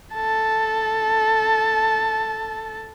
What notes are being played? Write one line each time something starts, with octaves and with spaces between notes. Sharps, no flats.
A4 A5